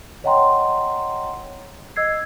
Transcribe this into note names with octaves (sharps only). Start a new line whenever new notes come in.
C#5 D#5 F#5 G5 A#5 C6
D#5 E6 G#6 C7